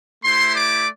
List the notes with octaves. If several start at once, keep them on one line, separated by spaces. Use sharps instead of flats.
A3 E4 G4 C5 C6
D5 D6